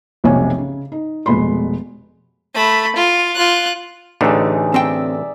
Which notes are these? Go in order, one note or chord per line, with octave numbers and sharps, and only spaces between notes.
F1 B1 C3 C#5 G#5
C#3
D#4
F1 B2 G#3 B5 C6
A3 B5
F4
F4 F#6
A1 D3 A3 D#4 G#4
C4 D5 E5 G5